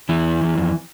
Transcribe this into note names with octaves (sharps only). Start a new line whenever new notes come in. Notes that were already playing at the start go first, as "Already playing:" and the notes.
E2 E3
E2
F2